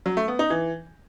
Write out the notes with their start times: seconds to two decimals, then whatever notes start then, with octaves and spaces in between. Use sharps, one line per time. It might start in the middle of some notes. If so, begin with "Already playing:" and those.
0.06 F#3
0.17 A3
0.28 B3
0.39 D#4
0.50 E3